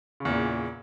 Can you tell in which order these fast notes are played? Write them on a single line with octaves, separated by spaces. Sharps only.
C#3 E2 A#2